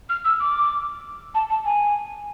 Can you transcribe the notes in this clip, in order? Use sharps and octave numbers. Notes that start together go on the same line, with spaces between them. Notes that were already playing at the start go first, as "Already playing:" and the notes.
F6
E6
D6
A5
A5
G#5